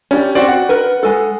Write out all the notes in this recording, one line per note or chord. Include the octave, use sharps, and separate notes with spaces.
C#4 D4 G4
C4 F#4 C5 D5 G5
F#5
A#4 B4
G#3 A4